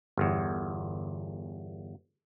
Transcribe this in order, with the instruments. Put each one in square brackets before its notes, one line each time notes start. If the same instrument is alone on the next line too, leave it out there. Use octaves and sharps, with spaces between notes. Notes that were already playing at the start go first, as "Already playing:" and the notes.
[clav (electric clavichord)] G1 E2